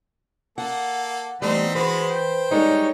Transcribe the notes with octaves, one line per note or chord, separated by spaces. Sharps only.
A#3 A4 F#5
E3 G3 A3 B3 C4 D#4 C5
G#3 F#4 B4 C5
G5
G3 G#3 D#4 A4 C#5